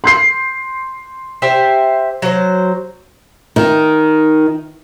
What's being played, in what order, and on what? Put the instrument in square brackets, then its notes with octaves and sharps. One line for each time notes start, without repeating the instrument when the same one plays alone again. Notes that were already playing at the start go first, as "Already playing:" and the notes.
[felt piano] C6 G6 C7
[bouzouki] G4 C5 E5
F#3 C5
[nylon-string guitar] D#3